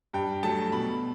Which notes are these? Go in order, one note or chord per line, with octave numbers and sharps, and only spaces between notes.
G2 G5
F#3 A3 A5
B2 B5